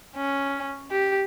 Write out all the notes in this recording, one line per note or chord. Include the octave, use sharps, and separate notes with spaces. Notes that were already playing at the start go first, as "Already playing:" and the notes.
C#4
G4